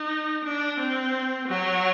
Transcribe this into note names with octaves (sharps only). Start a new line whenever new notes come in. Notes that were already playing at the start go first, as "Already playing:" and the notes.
Already playing: D#4
D4
C4
F#3